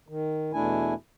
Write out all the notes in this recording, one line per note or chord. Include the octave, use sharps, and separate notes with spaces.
D#3
E2 B2 A3 D4 E4 G#5